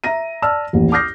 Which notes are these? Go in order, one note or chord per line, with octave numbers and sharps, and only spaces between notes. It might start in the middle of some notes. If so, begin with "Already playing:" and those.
E5 A#5 A#6 D#7
D5 A5 E6 F6
A1 D#2
D6 D#6 F6 G6 A#6 C7